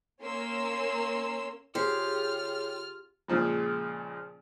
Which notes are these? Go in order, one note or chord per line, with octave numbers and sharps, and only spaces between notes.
A#3 C#4 A#4 C6 E6
C#3 F4 G4 G#4 C5 F6
A#2 C#3 F3 G#3